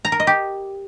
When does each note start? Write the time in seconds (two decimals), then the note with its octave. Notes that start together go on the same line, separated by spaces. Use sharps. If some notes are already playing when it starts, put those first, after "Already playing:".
0.05 A#5
0.12 A#4
0.20 D#5
0.27 G4